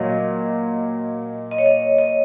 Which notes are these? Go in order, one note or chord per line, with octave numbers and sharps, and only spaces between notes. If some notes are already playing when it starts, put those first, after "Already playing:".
Already playing: A#2 F#3 D#5
D#5
C#5
D#5
D#5